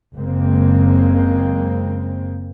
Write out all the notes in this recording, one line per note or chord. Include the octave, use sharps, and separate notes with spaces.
F#1 C#3 G#3 A#3 C4